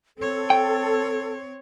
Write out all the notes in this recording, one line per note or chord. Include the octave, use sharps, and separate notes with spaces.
C4 A4 C#5
G5